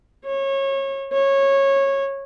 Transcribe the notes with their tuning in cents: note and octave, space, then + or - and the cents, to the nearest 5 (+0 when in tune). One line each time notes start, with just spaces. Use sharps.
C#5 -25
C#5 -15